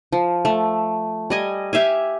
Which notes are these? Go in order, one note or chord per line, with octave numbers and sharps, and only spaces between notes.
F3
A3
G3 D#5 G#5
G4 E5 F5 G#5